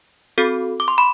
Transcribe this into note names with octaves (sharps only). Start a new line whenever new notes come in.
C4 F#4 A4
D6
C6
B5